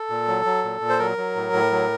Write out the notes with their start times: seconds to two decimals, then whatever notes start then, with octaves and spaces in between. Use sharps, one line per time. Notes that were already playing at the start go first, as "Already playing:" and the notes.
Already playing: A4
0.10 A#2
0.28 F#3
0.46 F#3
0.64 A#2
0.81 A#2
0.89 C5
0.99 F#3 A#4
1.18 F#3
1.36 A2
1.53 A2
1.71 F#3